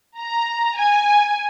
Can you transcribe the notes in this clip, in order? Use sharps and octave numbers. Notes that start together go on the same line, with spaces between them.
A#5
G#5